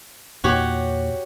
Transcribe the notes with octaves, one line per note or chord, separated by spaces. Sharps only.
E2 A#2 A#3 F#4 G4 C#5